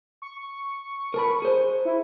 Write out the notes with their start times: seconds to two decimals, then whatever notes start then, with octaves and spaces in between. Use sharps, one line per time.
0.22 C#6
1.14 A#4 A5 B5
1.42 G#4 C5
1.85 E4